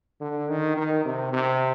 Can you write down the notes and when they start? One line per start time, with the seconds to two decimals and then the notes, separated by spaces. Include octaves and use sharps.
0.20 D3
0.49 D#3
0.77 D#3
1.05 C3
1.33 C3